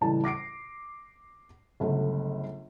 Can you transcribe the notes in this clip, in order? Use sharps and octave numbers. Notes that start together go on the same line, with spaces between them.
C#2 A2 E3 G3 A5
D6 A#6 C7 D7
G1 C#2 F#3 A3